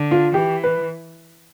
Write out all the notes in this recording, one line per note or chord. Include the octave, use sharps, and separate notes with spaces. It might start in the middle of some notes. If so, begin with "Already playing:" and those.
Already playing: D3
F4
E3 G4
B4